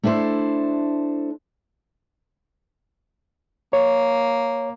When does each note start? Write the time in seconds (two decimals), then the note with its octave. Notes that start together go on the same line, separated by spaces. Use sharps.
0.03 A3 D4 E4 A4 C5
3.73 A#3 C#5